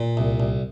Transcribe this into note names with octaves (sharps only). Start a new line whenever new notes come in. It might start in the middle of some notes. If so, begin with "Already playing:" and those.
Already playing: A#2
C2
C2